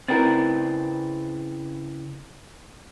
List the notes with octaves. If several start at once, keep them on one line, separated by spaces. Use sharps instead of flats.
C#3 C4 E4 A#4 B4 D5 G5 A6